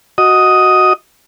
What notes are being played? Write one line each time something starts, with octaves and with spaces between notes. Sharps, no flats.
F#4 D#5 D#6